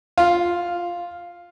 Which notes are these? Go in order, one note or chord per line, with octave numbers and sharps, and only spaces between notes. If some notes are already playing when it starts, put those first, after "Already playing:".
F4